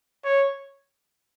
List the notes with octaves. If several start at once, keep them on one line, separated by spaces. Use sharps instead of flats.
C#5